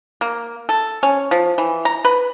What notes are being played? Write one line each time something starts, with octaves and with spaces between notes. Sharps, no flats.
A#3
A4
C#4
F3
E3
A#5
B4